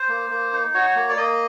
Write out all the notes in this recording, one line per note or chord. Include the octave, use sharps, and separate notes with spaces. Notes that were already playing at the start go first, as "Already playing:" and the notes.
Already playing: C5
A#3
A#3
D#4
F#4 C#5
A#3
D5
A#3 D#5